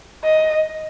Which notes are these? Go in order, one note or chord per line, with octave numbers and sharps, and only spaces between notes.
D#5